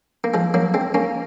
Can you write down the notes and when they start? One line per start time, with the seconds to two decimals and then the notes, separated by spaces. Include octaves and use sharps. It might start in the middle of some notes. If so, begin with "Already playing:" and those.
0.24 A#3
0.34 F3 G#3
0.54 F#3 A#3
0.74 G#3 C4
0.94 A#3 C#4